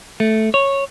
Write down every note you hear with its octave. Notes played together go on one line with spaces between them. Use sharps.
A3
C#5